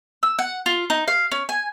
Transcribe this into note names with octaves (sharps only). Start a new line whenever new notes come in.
E6
F#5
F4
D#4
F5
C#4
G#5